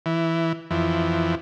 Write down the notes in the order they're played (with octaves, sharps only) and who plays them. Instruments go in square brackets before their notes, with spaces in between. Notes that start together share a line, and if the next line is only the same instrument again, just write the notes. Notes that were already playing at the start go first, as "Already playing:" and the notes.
[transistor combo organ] E3
F2 E3